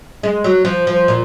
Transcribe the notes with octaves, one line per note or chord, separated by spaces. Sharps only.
G#3
F#3
F3
F3
A#2